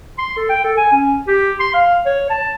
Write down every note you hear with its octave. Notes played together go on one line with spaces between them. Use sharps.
C6
A4
G5
A4
G#5
C#4
G4
C6
F5
C#5
A5